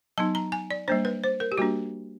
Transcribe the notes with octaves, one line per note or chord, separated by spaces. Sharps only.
F#3 B3 D#4 A5
A#5
G#5
D5
G3 A#3 D4 C5
B4
C5
A#4
G4
G3 A#3 D4 F#4